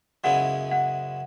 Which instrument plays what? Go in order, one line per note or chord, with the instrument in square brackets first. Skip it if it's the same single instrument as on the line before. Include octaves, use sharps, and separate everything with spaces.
[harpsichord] F#2 C#3 G#3 B3 E4 [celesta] F#5
[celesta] F#5